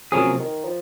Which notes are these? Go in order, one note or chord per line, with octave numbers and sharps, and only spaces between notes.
C3 F3 F#3 A#3 C#4 G#4
D#3
F3